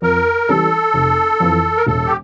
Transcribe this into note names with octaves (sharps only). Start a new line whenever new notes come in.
F2 A#4
E3 G3 C#4 G4 A4
F1
F2 E3
A#4
E1 A4
G4